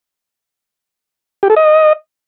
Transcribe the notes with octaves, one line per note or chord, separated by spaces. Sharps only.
G4
A4
D#5